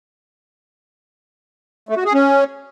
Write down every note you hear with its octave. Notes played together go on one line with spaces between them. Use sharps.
A3
F#4
G#4
C#4